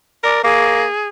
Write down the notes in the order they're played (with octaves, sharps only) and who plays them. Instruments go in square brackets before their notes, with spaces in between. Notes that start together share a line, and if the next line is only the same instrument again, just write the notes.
[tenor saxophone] A#4 [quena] D5
[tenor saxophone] A#3 [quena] G#4